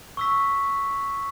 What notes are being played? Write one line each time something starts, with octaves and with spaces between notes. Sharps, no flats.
C#6 E6 B6